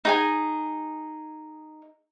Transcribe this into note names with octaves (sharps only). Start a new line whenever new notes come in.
D#4 G#4 G#5